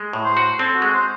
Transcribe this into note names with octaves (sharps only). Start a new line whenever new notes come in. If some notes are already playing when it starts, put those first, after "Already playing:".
Already playing: G#3
A2
C5
F#4
C4 A4
F#4
G#3
C5